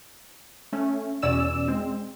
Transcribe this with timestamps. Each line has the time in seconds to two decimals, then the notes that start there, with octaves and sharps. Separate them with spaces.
0.73 A3 C#4
1.22 E2 B2 C#4 D5 E6 E7
1.68 G#3 C4